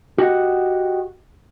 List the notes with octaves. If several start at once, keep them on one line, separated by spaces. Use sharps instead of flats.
F#4 G4 D#5 F#5